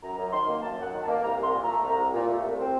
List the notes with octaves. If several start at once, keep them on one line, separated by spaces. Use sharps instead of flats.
F#2 A#5
F#2
D#3 C6
A#3
F#2 A5
F#2 F#5
D#3
A5
A#3
C2 A#5
C2
C6
A#2
A3 A#5
C2
C2
A#2
A3
C2
C4